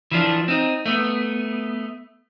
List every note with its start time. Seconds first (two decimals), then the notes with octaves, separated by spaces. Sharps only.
0.11 E3 F3 D4
0.48 C4 D#4
0.86 A3 B3